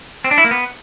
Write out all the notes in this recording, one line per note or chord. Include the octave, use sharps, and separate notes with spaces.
C4
D4
E4
A#3
B3